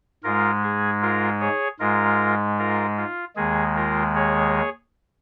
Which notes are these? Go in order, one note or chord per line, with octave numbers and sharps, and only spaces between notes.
G#2 G#3 F4 A#4
G#4
F4 A#4
G#4 C#5
G#2 G#3 F4 A#4
F4 A#4
F4
D#2 D#3 G#3 G#4
F4 A#4
G#4 C#5